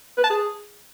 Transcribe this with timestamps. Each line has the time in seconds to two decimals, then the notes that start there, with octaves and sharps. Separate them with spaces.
0.18 B4
0.24 A5
0.30 G#4